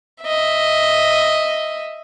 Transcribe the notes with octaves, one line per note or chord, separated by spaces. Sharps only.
D#5 E5